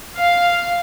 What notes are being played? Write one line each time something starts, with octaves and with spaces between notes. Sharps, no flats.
F5